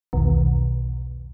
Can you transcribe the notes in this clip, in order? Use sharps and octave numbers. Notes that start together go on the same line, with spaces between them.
B1 E2 B2 D#3